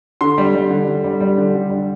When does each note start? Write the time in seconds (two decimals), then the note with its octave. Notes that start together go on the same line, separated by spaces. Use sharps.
0.21 D3 C6
0.38 G3
0.54 G3
0.70 D3
0.88 D3
1.04 G3
1.21 G3
1.38 D3
1.55 D3
1.70 G3